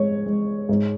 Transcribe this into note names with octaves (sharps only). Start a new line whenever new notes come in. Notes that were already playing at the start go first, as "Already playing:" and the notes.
Already playing: G#3 C#5
G#3
G#2